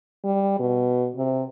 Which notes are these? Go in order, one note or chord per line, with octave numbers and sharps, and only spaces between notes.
G3
B2
C3